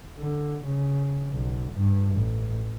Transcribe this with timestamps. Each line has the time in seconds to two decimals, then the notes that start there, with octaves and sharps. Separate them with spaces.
0.19 D3
0.65 C#3
1.32 B1
1.73 G2
2.17 A1